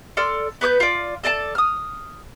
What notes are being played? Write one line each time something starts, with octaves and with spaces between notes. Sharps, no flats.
A4 D5 C6 F6
B3 B4 D6 G6
F4 D5
A4 D5 D#5 A5
D#6 F6